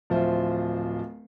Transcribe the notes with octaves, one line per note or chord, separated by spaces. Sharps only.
D1 F3 F4 C5 E5